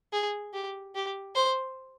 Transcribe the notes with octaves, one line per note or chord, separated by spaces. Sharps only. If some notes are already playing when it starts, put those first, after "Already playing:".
G#4
G4
G4
C5